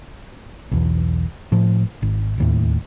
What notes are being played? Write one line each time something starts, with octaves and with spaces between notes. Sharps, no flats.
B1 E2
A2 F3
G#1
D1 D#2 A2